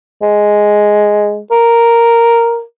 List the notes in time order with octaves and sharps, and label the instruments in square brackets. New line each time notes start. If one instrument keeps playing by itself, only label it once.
[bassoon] G#3
A#4